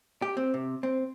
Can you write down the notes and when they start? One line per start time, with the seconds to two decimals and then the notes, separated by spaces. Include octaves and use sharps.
0.22 G4
0.37 C4
0.54 C3
0.83 C4